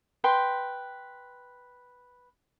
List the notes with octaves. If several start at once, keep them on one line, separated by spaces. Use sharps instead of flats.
B4 G5 C6